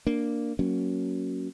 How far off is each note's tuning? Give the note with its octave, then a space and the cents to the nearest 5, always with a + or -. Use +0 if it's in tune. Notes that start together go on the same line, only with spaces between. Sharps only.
A#3 +0 D4 +0
F#3 +0 A#3 +0 C#4 +0